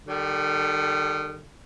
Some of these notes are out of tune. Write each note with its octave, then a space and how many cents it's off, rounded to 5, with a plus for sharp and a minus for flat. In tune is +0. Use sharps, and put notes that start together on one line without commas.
D#3 -35 G3 +0 A4 -10